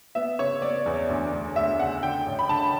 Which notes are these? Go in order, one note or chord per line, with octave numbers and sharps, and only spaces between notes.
B3 E5
C#3 C#5
B3 D5
E2
D2
D2
D2 E5
C#3 F#5
D3 G5
A1
B5
D3 A5